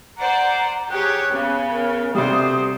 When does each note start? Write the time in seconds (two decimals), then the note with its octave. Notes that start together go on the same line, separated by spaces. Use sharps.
0.17 C5 D5 F#5 A#5
0.90 G4 G#4 C#5 F#6
1.31 C#3 B3
1.71 A#4
2.15 D2 C3 G3 C5 D#6